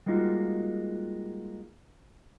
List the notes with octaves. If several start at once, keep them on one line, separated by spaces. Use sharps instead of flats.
G3 G#3 A#3 D#4 F4 F#4